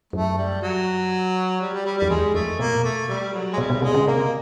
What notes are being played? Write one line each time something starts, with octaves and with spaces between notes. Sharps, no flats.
F#2 A3
G3
F#3
G3
G3
G3
F2 G3
E2 G#3
F2 A3
B2 A#3
A#2
B2 A3
G3
F#3
G#3
B2 G3
B2
C3 G#3
C#3
C3 A#3